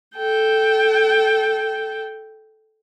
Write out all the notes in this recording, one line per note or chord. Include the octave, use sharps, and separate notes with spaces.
A4 G5